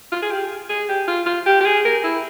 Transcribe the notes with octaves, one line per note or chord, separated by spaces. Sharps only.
F4
G#4
G4
G#4
G4
F4
F4
G4
G4
G#4
A#4
E4